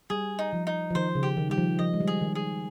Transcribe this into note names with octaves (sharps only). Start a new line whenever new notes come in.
G3 G#4
D#4
F3
D#4
F3
D#3 C5
C#3
G4
D#3
G3 G4
F3
F3 D#5
G#3
G3
G#4
D#3
G#4